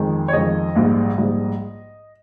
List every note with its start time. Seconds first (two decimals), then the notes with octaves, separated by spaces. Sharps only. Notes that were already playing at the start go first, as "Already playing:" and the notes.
Already playing: F2 D#3 G#3
0.28 C#5
0.33 F2 D#3 G#3 D#5
0.75 A#1 G#2 G3
1.18 A#1 G#2 G3